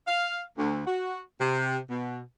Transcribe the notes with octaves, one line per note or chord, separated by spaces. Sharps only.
F5
D2
F#4
C3
B2